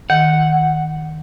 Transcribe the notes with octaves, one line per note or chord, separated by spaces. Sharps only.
D#3 F#5